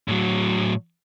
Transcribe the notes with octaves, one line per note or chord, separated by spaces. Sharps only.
A2 F#3